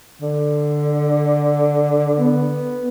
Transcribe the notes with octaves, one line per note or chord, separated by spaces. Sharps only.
D3
B3